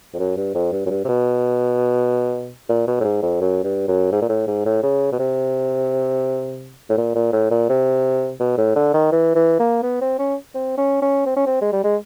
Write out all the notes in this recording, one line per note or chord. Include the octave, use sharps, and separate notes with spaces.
F2
F#2
G2
F2
G2
F#2
G2
C3
B2
A#2
B2
A2
G#2
F2
F#2
G2
F#2
G#2
A#2
A2
G#2
A2
C#3
B2
C3
A2
A#2
A#2
A2
A#2
C3
B2
A2
D3
D#3
E3
E3
A#3
B3
C4
C#4
C4
C#4
C#4
C4
C#4
C4
G#3
G3
G#3